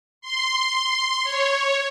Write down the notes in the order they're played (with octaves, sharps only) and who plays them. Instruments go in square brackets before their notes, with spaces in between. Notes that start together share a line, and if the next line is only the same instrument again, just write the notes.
[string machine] C6
C#5